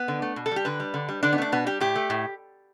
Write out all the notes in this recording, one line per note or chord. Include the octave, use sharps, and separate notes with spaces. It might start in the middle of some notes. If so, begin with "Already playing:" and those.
Already playing: B3
D3
A3
B2
A4
G3 G4
D3 B4
G3
D3
G3
D3 D4
B3
A3 D4
B2 B3
G3 G4
A2 G4
A3
A2